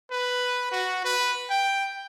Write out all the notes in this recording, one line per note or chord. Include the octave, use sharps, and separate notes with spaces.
B4
F#4
B4
G5